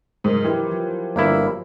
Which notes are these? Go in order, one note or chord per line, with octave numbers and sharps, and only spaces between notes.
G#2 F#3 A#4 C5
E3 F3 G4 B4
F3
F#3
G1 A#3 E4